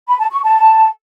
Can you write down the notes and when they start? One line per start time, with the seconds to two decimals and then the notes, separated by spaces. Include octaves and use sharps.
0.08 B5
0.20 A5
0.31 C#6
0.43 A5